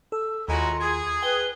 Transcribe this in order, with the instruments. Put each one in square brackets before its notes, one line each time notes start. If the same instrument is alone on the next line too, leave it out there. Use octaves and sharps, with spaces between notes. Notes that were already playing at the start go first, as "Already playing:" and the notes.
[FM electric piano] A4 [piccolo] E6
[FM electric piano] D#2 [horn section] A2 G#3 F#4 [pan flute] F4 [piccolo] A#5
[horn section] G#4 [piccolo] G#6
[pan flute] B4 [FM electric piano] G5 [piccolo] G7